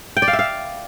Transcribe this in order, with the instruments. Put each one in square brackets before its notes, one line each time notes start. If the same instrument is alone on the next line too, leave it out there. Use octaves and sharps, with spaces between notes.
[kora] G5
D5
F5
E5
F5